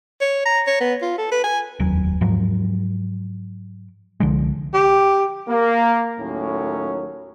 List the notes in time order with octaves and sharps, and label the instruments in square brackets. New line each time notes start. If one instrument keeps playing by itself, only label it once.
[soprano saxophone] C#5
A#5
C#5
B3
F4
A4
B4
G#5
[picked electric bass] F1 D#2 F#3
G#2 F3 F#3
C2 D3 F3 G#3
[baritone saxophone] G4
[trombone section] A#3
D#2 A2 F#3 C#4